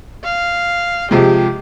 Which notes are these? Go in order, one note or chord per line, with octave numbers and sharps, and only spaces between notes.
F5
C3 F3 G#3 G4